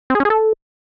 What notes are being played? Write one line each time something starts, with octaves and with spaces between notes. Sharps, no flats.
C4
G#4
C#4
G#4
A4